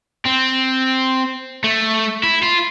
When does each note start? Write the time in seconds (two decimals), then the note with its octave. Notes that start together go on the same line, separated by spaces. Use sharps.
0.25 C4
1.64 A3
2.23 E4
2.43 F4